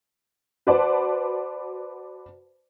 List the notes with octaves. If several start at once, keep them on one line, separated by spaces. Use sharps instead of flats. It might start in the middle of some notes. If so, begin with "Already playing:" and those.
F#4 B4 C5 D5 F#5 A5